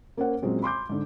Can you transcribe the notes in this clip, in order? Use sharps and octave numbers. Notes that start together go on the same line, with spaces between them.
A#3 C#4 A#4 C5 F#5
A#2 F#3 G#3 C4 C#4
B5 C6 D6 G6
G#2 D3